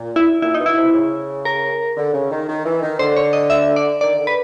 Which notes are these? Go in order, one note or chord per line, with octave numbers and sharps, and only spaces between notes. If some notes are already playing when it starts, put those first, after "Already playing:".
Already playing: A#2
E4
A#2 E4
B2 D#4
E4
C3
C#3
A#4
D3
C#3
D#3
D#3
E3
D#3
D3 C5
C#5
D#5
E5
D5
D#3 D5
D3
B4